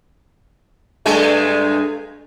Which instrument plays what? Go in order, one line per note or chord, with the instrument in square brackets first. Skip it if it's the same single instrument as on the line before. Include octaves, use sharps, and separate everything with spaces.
[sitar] G2 G#3 A3